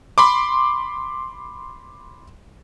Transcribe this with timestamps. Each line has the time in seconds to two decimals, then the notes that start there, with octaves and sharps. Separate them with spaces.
0.18 B5 C6 D6